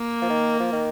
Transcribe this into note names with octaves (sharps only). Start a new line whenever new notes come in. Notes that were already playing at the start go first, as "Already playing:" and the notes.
Already playing: A#3
F3
D#3
F3
D#3